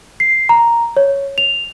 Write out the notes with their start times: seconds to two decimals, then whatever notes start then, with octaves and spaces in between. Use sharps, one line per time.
0.20 C7
0.49 A#5
0.97 C#5
1.38 F7